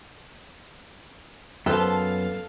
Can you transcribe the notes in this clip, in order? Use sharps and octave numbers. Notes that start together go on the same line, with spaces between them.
F#2 B3 A4 B4 C5 F5 A5